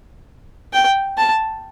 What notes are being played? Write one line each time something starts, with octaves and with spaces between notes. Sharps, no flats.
G5
A5